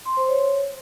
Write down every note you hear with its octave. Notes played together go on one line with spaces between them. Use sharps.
C6
C5
C#5